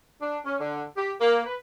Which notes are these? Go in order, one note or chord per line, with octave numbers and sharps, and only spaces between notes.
D4
C#4
D3
G4
A#3
B4